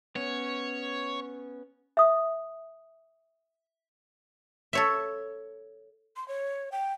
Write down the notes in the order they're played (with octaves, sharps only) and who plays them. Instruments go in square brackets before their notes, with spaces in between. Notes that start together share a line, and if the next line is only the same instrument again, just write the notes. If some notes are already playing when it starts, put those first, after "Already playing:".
[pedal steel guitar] B3 C#4 [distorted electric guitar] C#5
[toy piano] E5 D#6
[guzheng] A4 C#5 E5
[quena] C6
C#5
G5